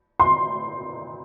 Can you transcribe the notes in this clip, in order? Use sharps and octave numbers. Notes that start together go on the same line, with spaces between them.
C6